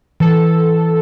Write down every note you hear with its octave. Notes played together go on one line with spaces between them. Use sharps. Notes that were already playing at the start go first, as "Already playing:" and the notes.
E3 A4